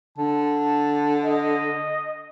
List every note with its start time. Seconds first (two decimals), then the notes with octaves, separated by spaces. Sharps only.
0.18 D3 A5
1.23 D#5